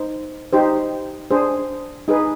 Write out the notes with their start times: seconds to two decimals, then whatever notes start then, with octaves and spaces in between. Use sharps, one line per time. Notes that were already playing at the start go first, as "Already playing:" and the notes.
Already playing: D#4 C5
0.53 D#4 G4 C5
1.31 D4 G#4 C5
2.08 D#4 G#4 B4